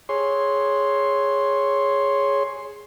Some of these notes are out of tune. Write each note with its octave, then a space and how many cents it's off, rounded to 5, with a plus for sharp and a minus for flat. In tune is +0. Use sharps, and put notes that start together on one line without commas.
G#4 +0 C#5 +0 C6 +5